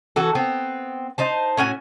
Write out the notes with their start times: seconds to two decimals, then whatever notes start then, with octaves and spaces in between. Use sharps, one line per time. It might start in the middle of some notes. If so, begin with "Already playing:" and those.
0.16 E3 F#4 A4
0.35 B3 C4
1.18 D#4 C5 A5
1.57 A2 C#4 F#4 G#5